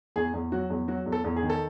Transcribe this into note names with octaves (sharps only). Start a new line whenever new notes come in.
E2 G#4
E2
F#3 F#4
E2
F#3 F#4
E2
A4
E2
G#4
D#3
A4